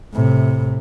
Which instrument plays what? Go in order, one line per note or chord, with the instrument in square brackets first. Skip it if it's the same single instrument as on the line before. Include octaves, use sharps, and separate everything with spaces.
[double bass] A2 C3